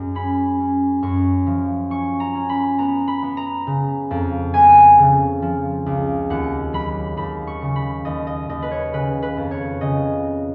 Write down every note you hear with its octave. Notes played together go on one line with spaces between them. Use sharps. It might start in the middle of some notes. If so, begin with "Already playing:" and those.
Already playing: F#2 G#3
C#4 B5
C#4
F#2 C#6
F3
C#4 C#6
A#5
C#4
B5
B3 A#5
B5
B3
A#5
C#3
F2
B3 G#5
C#3
F3
C#2
D#2 F#5
F#3 B5
D#2 B5
C#6
C#3
B5
D#2 D#5
D#5
D#2 D#5
B4
C#5
C#3 B4
B4
F2
C#5
C#3 D#5